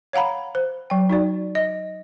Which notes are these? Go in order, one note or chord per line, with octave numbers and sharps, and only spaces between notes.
C#5 F5 F#5 A#5 B5
C5
F#3 G5
D#4 F#4 D5
D#5